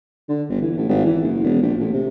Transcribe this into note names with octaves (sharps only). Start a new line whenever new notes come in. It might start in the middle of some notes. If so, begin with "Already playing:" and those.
D3
G1
E3
A1
G#1
E3
F#1
E1
A#1
A1
C3